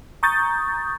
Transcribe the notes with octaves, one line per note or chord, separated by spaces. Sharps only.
A#5 C#6 D#6 G6 A6